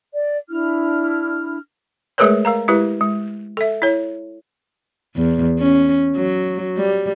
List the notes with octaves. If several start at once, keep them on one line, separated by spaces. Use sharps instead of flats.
D5
D4 E4 F6
G#3 A3 G#4 A#4 B4 C#5
A#4 F5 A#5
G#3 E4 G4 B4
G#3
A4 E5
E4 C#5
E2
C#4
F#3
G3